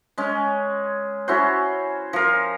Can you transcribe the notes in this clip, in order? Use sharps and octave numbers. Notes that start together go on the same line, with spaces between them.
G#3 C#4
C#4 E4 F#4 C5
F3 A#4